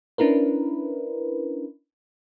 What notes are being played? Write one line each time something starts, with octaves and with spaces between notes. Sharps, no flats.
C#4 D4 E4 A#4 B4